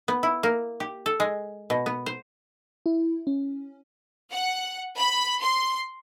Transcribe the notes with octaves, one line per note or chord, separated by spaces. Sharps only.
B3
E4
A#3
G4
A4
G#3
B2
B3
C5
E4
C#4
F#5
B5
C6